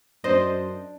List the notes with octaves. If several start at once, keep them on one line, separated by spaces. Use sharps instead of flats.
F#2 D4 C5 D#5